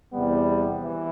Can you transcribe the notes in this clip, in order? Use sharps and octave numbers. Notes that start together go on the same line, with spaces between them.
E2 C3 G3 B3
E3